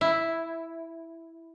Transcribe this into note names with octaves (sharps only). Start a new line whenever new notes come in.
E4